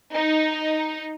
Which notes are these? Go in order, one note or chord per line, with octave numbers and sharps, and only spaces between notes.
D#4